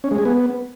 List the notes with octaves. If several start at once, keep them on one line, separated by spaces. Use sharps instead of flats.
C#4
G#3
G#4
B3